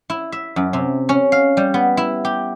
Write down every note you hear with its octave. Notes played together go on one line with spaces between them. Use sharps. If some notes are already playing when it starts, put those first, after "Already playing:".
E4
E5
F#2
C3
C#4
F5
G3
B3
E4
G4